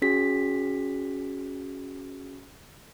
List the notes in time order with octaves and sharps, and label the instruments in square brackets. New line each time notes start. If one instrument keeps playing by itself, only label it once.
[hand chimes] C#4 F#4 G#4 B6